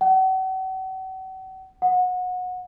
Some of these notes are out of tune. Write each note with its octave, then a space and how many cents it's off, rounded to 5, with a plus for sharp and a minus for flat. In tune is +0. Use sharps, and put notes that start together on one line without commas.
F#5 +40
F#5 -25